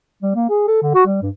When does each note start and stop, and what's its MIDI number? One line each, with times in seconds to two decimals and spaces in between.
0.23 0.33 55
0.35 0.45 58
0.50 0.63 68
0.68 0.79 69
0.82 0.91 50
0.94 1.04 66
1.06 1.18 55
1.22 1.30 43